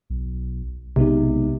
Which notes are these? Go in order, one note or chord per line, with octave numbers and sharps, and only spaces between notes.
B1
B1 C3 G#3 B3 D#4